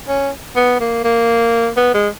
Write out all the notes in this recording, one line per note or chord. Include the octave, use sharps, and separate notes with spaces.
C#4
B3
A#3
A#3
B3
G#3